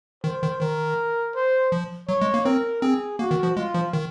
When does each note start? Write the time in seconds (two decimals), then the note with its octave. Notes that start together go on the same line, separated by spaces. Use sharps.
0.24 D#3 C5
0.42 D#3
0.61 D#3 A#4
1.35 C5
1.72 F3
2.09 F#3 C#5
2.22 G#3
2.34 A#3
2.45 C4 A#4
2.82 C4 G#4
3.19 A#3 F#4
3.31 D#3
3.43 F3
3.56 G#3 F4
3.74 F3
3.93 D#3